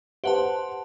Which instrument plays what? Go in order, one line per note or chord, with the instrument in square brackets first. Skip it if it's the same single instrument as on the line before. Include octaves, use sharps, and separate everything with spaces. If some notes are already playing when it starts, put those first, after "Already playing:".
[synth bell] G4 B4 A5 [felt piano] C5 F#5 C6